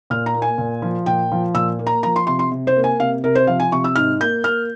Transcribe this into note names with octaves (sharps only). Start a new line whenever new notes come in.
A#2 F6
A#5
A#3
G#5
A#2
F3
A#2 G5
F3
A#2 E6
A#3
A#5
F3 A#5
C6
C3 C6
C6
C3
C5
A#3
G#5
C3 F5
C3 A#4
C5
F3 F5
G#5
C3 C#6
E6
G#2 F6
A#3 G6
A#3 F6